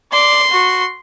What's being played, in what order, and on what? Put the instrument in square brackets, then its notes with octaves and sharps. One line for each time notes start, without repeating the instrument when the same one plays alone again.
[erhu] D5 [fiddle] C6
[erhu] F#4